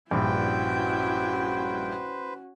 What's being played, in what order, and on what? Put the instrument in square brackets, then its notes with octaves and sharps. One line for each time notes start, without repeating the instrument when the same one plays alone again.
[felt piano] A#1 G2 [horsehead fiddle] C#4 F#4 [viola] E4 G5 [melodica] B4 C5